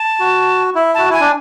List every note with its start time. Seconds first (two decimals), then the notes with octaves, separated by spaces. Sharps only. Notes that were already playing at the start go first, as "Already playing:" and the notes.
Already playing: A5
0.20 F#4
0.75 E4
0.95 F#4 A5
1.10 E4 G#5
1.21 D4